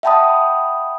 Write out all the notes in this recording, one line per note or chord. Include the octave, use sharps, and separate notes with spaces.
E5 F#5 G5 A5 B5 D#6